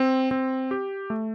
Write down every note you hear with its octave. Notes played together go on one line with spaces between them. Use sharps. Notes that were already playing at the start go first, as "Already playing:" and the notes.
Already playing: C4
C4
G4
A3